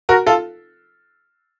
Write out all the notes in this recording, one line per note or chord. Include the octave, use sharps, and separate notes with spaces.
F#4 A#4
F4 A4